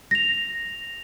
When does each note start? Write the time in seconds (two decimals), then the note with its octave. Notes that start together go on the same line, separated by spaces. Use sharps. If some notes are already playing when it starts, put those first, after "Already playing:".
0.11 A#6 F7